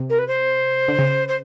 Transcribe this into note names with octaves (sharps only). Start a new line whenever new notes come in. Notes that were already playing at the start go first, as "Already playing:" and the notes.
Already playing: C3
A#4
B4
C5
D3
C#3
C5